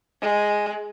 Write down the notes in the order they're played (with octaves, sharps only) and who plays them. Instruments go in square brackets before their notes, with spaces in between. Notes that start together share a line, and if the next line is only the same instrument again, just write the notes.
[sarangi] G#3